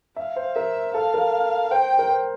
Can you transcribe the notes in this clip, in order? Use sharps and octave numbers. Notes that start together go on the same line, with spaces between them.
E5 F5
C5
A#4 E5
A4 F5
A#4
C5 G5
A#4
C5